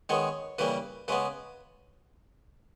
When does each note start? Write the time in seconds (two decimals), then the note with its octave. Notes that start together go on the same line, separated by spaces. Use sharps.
0.09 D#3 G#3 B3 C#5
0.59 C#3 E3 G3 A#3 B4
1.08 C#3 G#3 B3 B4